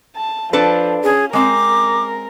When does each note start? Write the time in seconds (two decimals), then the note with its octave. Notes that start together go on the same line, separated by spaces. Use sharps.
0.16 A5
0.53 F3 D4 A4 B4
1.04 C#4 G#4
1.33 G#3 C4 A#4 D6